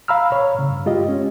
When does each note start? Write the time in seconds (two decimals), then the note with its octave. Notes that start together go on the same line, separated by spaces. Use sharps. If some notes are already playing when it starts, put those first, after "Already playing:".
0.08 F5 A#5 B5 E6 F6
0.32 C#5
0.55 A2 C#3
0.69 G2
0.86 G#3 F4 G4 D#5
1.09 C#4